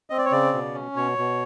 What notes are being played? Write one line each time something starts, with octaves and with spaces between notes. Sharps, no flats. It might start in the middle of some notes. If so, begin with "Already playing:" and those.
C4 D#5
D5
C#5
C#3 D5
B2
C#4
B2 C#5
B2